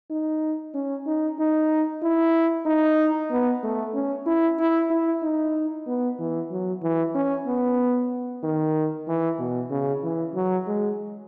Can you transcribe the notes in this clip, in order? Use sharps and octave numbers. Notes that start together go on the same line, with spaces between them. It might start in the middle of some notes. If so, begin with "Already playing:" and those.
D#4
C#4
D#4
D#4
E4
D#4
B3
A3
C#4
E4
E4
E4
D#4
B3
E3
F#3
E3
C#4
B3
D#3
E3
B2
C#3
E3
F#3
G#3